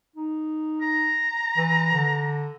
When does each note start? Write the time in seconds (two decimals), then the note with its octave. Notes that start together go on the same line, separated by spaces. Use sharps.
0.16 D#4
0.81 A#5
1.57 E3
1.93 D3